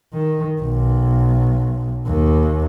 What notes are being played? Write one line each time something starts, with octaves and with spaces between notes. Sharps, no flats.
D#3
B1
D#2